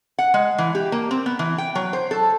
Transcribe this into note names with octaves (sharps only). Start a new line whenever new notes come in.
F#5
G#3
E3
G4
A#3
C4
B3
E3
G5
F#3
C5
A4